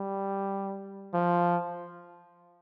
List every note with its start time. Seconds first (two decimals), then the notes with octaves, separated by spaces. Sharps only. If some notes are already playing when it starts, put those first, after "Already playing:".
Already playing: G3
1.14 F3